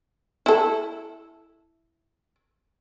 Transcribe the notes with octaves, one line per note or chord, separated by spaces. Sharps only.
E4 A4